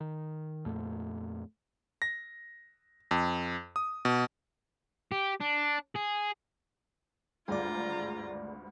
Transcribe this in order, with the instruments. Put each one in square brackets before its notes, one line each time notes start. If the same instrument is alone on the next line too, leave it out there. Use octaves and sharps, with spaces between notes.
[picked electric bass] D#3
F2 A#2 A3
[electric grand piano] A#6
F2
D#6
B2
[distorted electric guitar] G4
D4
G#4
[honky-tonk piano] G#1 D2 G2 [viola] F4 A#5 [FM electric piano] G#4 D5